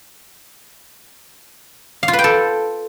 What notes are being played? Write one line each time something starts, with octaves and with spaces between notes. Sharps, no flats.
F5
F4
B4
G5
A4